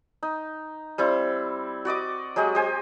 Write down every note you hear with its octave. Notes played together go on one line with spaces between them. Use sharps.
D#4
G3 C4 E4
F#4 D5 D#5 D6
F#3 G#3 G4 D#5
G4 C5 G#5